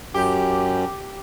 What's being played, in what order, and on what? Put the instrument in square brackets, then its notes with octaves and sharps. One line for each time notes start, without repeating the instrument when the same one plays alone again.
[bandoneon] F#2 [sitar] G4